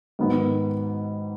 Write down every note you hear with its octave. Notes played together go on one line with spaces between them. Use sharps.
G#2 D#3 F#3 B3